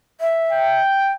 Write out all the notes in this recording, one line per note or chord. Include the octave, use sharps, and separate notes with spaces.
E5
G5